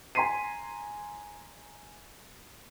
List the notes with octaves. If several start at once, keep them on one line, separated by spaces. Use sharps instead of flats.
G#5 A#5 C6 B6 C7 D#7